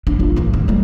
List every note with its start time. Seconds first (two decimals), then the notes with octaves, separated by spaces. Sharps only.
0.07 D4
0.20 F4
0.36 D#3 E3
0.54 B3
0.68 G3 G#3